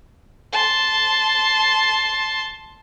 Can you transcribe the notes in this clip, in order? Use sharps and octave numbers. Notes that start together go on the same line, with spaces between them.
A5 C6